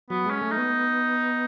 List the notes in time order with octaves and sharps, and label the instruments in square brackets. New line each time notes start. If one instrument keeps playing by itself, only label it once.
[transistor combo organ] F#3 [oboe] B3
[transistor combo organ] G#3
[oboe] C#4
[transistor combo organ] A3
[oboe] D#4
[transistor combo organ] B3